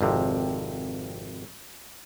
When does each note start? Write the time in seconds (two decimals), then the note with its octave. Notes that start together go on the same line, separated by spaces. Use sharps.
0.01 G#1 F2 C3